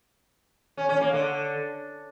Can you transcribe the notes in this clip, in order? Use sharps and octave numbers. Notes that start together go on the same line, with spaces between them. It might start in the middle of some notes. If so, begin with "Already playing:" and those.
C#4
C#4
A#3
D3